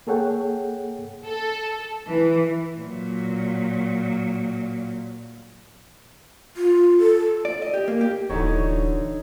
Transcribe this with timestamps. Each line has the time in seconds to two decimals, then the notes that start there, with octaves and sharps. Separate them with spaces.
0.07 A#3 G#4 A4 C#5 F#5 G5
1.25 A4
2.08 E3
2.76 A#2 F#3
6.57 F4
7.00 A4
7.45 D5
7.62 D#5
7.74 G4
7.88 A#3
8.01 G4
8.29 D#1 D3 E3 D#4 F#4 C#5